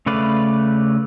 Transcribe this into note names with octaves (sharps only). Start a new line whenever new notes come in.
C#3 A3 B4 D5 F5